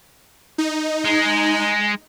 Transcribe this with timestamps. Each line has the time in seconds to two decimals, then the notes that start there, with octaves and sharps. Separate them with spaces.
0.58 D#4
1.05 G#3